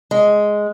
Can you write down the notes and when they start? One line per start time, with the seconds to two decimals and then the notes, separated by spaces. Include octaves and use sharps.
0.11 G#3